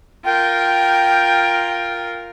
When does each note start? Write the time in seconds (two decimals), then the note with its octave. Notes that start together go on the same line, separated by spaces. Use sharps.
0.24 F4 A#4 G5